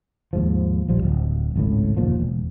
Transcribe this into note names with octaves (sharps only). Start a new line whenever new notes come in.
D#2 G#2 F3
A#1 F3 G3
D1
G#1 C#2 A2
F#1 D#2 A#2 F3
E1